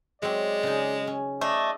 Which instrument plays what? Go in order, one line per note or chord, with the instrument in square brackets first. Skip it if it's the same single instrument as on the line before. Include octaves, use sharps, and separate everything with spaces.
[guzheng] F#3 C4 [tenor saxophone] G#3 [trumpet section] D5
[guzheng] C#3 D#4
C#4
[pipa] A3 [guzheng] C5 [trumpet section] D5 D#5